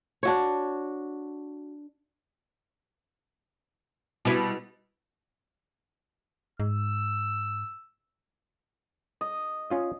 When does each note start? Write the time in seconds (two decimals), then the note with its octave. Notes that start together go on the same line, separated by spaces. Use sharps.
0.23 D4 F#4 C#5
4.25 B2 G3 E4 B4
6.60 G#2 E6
9.21 D#5
9.70 C#4 F4 D#5